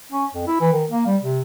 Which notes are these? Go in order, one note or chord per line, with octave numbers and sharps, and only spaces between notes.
C#4
F2
E4
E3
D#3
A#3
G3
C3